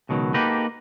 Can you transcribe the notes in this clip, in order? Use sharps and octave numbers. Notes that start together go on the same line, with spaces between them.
C#2 B2 D#3 F#3
A#3 D#4 F#4 G4 A4 B4